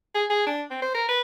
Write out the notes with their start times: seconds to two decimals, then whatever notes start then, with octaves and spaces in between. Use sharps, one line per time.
0.14 G#4
0.30 G#4
0.47 D4
0.71 C4
0.82 C5
0.95 A#4
1.08 B4